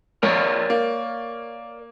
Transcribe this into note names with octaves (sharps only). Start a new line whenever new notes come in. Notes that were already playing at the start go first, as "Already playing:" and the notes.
A#1 A#4 C#5 D5
A#3